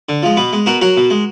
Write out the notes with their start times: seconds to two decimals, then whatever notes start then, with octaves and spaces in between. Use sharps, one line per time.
0.09 D3
0.23 F3 G#3
0.37 B2 B3
0.53 G#3
0.66 B2 F#4 A#4
0.81 F#3 F#4 A#4
0.97 B2
1.10 G#3